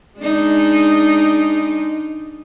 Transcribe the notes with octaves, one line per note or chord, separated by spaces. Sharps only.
G#3 D4 D#4